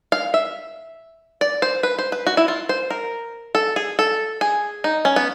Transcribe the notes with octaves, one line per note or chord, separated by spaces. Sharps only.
F5
E5
D5
C5
B4
C5
B4
F#4
E4
F4
C5
A#4
A4
G#4
A4
G#4
D#4
C#4
B3